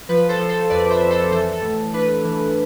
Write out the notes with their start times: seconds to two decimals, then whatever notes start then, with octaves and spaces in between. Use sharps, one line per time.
0.09 F3 B4
0.29 A4 C5
0.39 F3
0.49 A4 C5
0.69 F2 B4 D5
0.90 C5 E5
1.01 F2
1.11 A4 C5
1.31 E3 A4 C5
1.53 A4
1.62 A2
1.93 D4 B4
2.24 E3